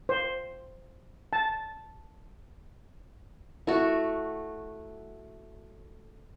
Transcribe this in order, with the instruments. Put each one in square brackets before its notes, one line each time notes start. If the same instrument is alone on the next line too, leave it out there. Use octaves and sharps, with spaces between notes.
[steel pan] C5
A5
[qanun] A3 F#4 [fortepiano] E4